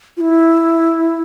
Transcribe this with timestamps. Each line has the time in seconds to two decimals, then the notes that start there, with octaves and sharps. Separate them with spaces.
0.17 F4
0.21 E4